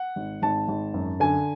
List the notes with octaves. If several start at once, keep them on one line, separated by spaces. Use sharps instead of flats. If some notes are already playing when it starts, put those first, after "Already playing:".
Already playing: F#5
G#1
G#1 A5
G#1
F#2
D3 G#5